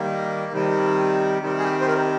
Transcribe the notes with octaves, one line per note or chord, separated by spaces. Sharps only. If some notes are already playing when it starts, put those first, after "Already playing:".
Already playing: D#3 G3 A#3
C3 D#3 G3
C3 D#3 G3
G#4
G4
C5
A#4